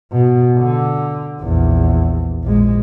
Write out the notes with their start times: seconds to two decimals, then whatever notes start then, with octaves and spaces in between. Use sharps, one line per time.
0.13 B2
0.58 D3
1.41 A#1 E2
2.44 A#1 G#3